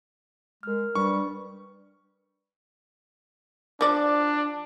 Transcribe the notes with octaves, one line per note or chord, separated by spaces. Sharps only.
G#3 A#4 F6
G3 D4 B4 C#6
F3 D4 D5